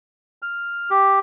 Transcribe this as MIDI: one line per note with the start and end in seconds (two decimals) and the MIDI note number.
0.42 0.90 89
0.90 1.19 67